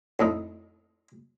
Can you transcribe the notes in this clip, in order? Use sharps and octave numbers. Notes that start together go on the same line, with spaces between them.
F2 A2 D#4